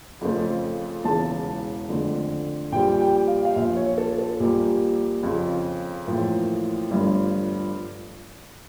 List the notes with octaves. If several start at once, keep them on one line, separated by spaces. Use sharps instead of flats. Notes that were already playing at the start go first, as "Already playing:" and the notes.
F2 C#3 F3 A3
E1 E2 C#3 A5
F2 D3 A3
A#1 A#2 G3 G5
G5
F5
F5
A#1 A#2 F3 E5
C#5
A4
A4
A#1 A#2 G3 A#3 G4
F2 C#3 F3
A1 A2 F3 A#3
G1 G2 F3 A3